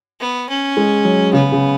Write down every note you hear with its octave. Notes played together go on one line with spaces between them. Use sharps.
B3
C#4
G#3
F#3
C#3 B3
C#3